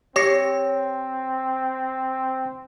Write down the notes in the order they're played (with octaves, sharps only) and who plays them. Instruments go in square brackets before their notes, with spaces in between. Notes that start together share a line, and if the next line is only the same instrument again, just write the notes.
[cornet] C4 [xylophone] G4 A#6 C7 [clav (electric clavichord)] C#5